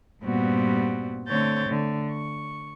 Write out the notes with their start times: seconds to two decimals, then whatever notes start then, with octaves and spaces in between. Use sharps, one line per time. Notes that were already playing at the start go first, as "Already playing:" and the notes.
0.23 G2 A#2 G3 B3 C4 F#4
1.28 D3 A3 C4 C#5 G6 A6
1.66 D3 A3
2.10 C#6